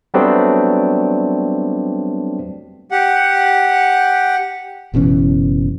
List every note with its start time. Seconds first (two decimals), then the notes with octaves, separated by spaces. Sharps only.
0.14 F#3 G3 A3 B3 C4 D4
2.91 G4 F#5
4.94 F#1 B2 E3 C#4